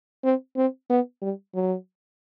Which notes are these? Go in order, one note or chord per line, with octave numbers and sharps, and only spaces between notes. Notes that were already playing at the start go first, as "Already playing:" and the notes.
C4
C4
B3
G3
F#3